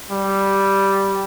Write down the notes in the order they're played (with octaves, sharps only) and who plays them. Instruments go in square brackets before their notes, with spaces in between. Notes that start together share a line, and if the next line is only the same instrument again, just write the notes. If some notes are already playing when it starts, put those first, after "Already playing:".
[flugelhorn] G3